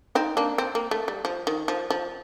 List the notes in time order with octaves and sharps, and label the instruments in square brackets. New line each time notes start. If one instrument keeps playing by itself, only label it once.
[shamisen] C4 D#4
A#3 D4
C4
A#3
A3
G3
F3
D#3
F3
F3